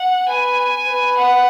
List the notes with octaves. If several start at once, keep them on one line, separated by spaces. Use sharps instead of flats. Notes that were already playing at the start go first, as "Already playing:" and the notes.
Already playing: F#5
B4 G#5
B4
F#5